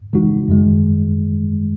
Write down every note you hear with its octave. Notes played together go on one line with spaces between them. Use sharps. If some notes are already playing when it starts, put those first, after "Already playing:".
C#3 E3 G#3 D#4 F#4
F#2 D#3 G#3